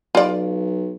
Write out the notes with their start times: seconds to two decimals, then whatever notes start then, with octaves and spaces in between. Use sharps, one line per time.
0.15 B1 F4 D5